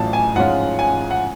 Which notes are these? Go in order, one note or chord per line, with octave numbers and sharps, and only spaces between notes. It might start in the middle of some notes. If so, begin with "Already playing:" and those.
Already playing: A1 A2 F#3 C#4 F4 A5
G#5
G#2 F3 G#3 C#4 F4 F#5
G#5
F#5